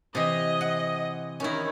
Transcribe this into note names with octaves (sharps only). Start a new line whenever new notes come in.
C3 E3 D#5
F#5
D#3 C#4 E4